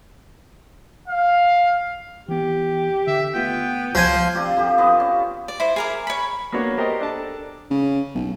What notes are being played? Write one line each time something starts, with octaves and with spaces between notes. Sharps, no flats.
F5
E3 B3 G4
D3 E5
A3 B3 F4 G5 B6
C#2 F3 C5 G#5 A5
C4 D4 F4 G4
D3 F3 G4
B3 F4 D#5 A5
C#4
D5
E4 C5
G#4 A#4 D6
C#5 B5
A#3 B3 D4 F#4 C#5
G4 A#4 C5 D5 D#5
D4 A4 A5
C#3
B1